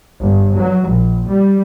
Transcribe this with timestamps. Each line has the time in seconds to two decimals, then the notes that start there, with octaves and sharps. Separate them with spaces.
0.19 G1
0.57 F#3
0.86 A#1
1.26 G3